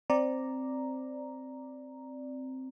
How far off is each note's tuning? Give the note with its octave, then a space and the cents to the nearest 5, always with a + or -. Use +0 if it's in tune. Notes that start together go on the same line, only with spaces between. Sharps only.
C4 +0 D5 +0 A#5 +0